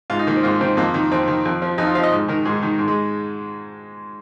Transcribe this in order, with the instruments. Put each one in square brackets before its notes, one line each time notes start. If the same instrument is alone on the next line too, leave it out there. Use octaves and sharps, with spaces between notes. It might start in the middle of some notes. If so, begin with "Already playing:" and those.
[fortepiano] G#2 F4
D#4
D#3 A#3
C4
G#2 F4
D#3 C4
F2 A#3
D#3
F2 C4
D#3
F2
F3
F2 D#4
F4
F3 F5
D#5
G#2
D#3 A#4
G#2 G#4
D#3
G#2
G#3